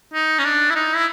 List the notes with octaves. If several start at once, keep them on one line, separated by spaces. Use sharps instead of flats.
D#4
C#4
D4
E4
D#4
E4